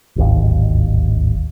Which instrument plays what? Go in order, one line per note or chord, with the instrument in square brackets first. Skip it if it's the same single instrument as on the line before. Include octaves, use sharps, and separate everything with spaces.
[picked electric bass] D1 G#1 D#2